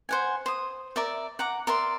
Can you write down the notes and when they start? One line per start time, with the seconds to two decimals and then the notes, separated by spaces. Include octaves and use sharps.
0.09 C5 F#5 G#5
0.46 C5 D#6
0.96 A#4 D5 E5
1.39 F#5 A#5 D6
1.67 A#4 D5 E5 C6